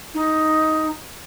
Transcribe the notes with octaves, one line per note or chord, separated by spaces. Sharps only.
D#4